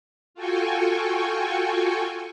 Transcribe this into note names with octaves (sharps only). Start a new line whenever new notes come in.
F4 F#4 A4 G5 G#5 C#6